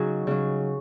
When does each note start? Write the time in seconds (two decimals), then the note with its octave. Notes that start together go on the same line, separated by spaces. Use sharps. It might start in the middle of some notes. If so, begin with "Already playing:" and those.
Already playing: C#3 F#3 D#4 F#4 G#4
0.27 C#3 F#3